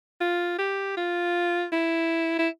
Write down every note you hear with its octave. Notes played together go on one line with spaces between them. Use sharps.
F4
G4
F4
E4
E4